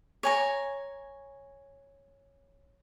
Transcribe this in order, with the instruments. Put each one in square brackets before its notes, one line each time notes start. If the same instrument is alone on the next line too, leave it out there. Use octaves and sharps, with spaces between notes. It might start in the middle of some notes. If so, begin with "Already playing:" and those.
[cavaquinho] C#5 G#5 A#5